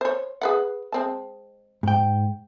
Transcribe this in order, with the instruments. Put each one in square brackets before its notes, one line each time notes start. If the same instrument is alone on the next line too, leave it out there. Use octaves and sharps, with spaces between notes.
[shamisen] C5 C#5
G#4 B4 F#5
G#3 C4 A5
[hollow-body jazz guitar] G#2 G5